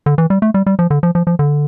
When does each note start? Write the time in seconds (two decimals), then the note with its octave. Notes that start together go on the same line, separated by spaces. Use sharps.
0.06 D3
0.18 E3
0.30 G3
0.42 A3
0.54 G3
0.66 G3
0.79 F3
0.90 D3
1.03 F3
1.15 F3
1.27 F3
1.39 D3